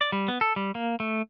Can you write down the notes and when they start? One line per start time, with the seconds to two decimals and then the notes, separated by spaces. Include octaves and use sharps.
0.01 D5
0.12 G3
0.28 B3
0.41 A4
0.56 G3
0.75 A#3
1.00 A3